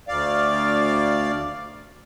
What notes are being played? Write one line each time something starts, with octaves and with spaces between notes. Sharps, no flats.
D2 D5 F5